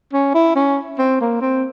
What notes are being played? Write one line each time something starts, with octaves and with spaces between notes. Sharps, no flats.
C#4
E4
C#4
C4
A#3
C4